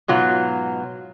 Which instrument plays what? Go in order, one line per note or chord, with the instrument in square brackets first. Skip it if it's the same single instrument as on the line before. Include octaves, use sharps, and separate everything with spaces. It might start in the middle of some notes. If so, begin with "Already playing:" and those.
[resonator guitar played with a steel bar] G#2 B2 F#3 F4